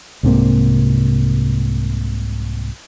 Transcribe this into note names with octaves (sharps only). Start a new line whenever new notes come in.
C2 G#2 C3 A#3